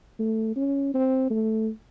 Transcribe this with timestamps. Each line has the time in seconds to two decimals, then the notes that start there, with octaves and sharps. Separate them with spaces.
0.19 A3
0.56 C#4
0.94 C4
1.30 A3